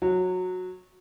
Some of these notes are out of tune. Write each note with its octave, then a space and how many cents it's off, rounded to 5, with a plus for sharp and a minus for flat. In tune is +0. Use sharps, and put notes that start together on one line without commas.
F#3 -15